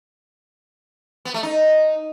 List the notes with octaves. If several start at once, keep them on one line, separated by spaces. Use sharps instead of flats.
B3
A3
D#4